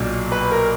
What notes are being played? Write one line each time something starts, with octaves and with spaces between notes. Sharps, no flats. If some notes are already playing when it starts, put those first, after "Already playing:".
Already playing: B1 A#2 F#3 D4
B4
A#4